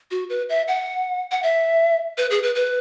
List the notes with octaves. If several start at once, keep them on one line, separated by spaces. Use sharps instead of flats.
F#4
B4
E5
F#5
F#5
E5
B4
G#4
B4
B4